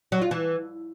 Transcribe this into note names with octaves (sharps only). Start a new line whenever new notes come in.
F#3
F4
E3